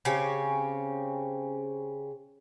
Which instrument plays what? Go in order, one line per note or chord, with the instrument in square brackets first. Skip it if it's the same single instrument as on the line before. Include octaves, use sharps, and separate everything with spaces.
[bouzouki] C#3 C4 C#4 G4